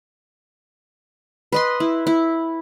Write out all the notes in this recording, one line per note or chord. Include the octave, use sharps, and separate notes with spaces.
B4 D#5 C6
E4
E4